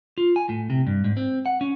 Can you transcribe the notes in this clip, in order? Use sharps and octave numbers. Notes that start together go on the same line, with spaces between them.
F4
G#5
A2
C3
G2
G#2
C4
F#5
C#4